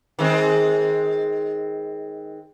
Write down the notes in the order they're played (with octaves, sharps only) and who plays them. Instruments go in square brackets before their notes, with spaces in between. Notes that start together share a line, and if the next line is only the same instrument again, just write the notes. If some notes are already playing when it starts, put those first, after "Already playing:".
[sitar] D#3 G#3 C4